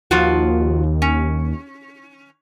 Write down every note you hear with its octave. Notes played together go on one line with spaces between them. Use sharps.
D#2 F3 F4 F#4
C#4